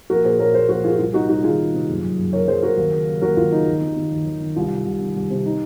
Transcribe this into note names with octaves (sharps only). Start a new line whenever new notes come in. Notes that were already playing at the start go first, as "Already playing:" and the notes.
A#1 F#4 A#4
A#2 G#4 C5
A#2 A#4 C#5
A#1 G#4 C5
A#1 F#4 A#4
A#2 F4 G#4
F#4
C2 F4
C3 D#4 F#4
C2 D#4 F#4
D#3 F4 G#4
C2
C3
F#1
F#2
F#1
C#3 A#4 C#5
F#1 G#4 C5
F#2 F#4 A#4
D#2
C#3
C#3
D#2 F#4 A#4
D#2 F4
C#3 D#4
D#2
D#3
D#3
D#2
D#2
D#3
C2 F4
C3
C2
D#3
C2
C3
D#4